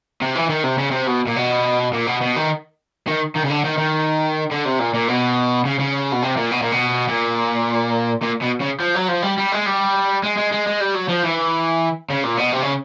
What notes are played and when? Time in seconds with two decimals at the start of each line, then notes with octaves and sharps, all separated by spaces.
0.21 C3
0.35 E3
0.49 D#3
0.64 C3
0.78 C#3
0.91 C3
1.07 B2
1.27 A#2
1.36 B2
1.93 A#2
2.07 B2
2.21 B2
2.36 D#3
3.08 D#3
3.36 D#3
3.45 C#3
3.50 D3
3.65 D#3
3.78 D#3
4.51 D3
4.65 C3
4.79 A#2
4.94 A#2
5.08 B2
5.65 C#3
5.79 C#3
6.12 B2
6.22 C3
6.36 A#2
6.51 B2
6.62 A#2
6.72 B2
7.08 A#2
8.23 A#2
8.42 B2
8.61 C#3
8.80 F3
8.95 F#3
9.09 F3
9.22 G3
9.37 G3
9.52 G#3
9.66 G3
10.23 G#3
10.37 G#3
10.52 G#3
10.67 G#3
10.80 G3
10.95 F#3
11.09 F3
11.24 E3
12.10 C#3
12.24 A#2
12.38 B2
12.53 C3
12.62 C#3